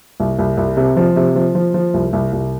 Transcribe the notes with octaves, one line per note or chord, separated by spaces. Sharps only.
C2
C2
C2
C3
F3
C3
F3
F3
F3
C2
C2
C2